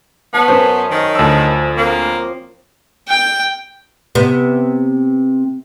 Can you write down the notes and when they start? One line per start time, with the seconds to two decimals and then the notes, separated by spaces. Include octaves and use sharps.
0.34 B3 C#5 E5 A5
0.48 F#2 C#4 B4 C5
0.90 D#3
1.15 D2 F3 E6
1.77 A#3 C4
3.08 G5
4.15 C3 B3